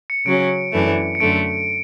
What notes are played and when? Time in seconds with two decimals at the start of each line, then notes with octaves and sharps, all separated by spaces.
0.10 C#7
0.26 C#3 F#3 C#4 D7
0.73 F#2 E3 A3 D4
1.15 C#7
1.20 F#2 D3 A3 D7